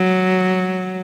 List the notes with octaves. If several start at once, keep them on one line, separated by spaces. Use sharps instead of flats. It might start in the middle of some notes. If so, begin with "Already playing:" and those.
Already playing: F#3